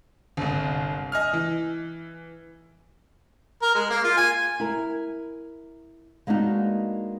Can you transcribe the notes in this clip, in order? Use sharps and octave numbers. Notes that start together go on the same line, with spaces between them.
G1 C2
D#5 G#5 F6
E3
A#4
G#3
A#3
F4
G#5
E4 A#4
G#3 A#3 B3 D4 D#4 F#4